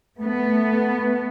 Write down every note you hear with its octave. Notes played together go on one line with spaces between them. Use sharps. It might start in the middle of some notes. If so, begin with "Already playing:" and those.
A3 B3